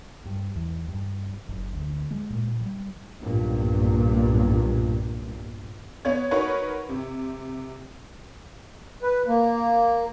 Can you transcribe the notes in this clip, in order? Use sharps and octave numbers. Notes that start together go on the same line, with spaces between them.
G2
E2
G2
F#1
D2
G#3
A#2
G3
B1 G2 A#2
B3 C#5 G#6
D#4 F#4 A#4 B4 C#5 C#6
C3
B4
A#3